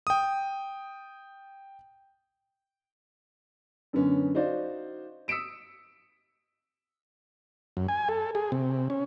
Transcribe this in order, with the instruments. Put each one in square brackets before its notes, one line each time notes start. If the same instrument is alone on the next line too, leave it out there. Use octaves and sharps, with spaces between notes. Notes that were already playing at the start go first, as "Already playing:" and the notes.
[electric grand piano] G5 D#6
[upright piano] F#2 D3 B3 C#4
D#4 F#4 C5 D5 F5
D#6 E6 B6 C#7 D7 E7
[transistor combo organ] F#2
G#5
A4
G#4
C3
C#4